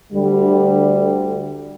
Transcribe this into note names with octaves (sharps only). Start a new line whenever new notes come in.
D2 D3 G3